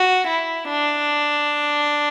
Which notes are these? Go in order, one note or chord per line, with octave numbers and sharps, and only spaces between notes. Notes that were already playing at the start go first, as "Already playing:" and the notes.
Already playing: F#4
E4
D4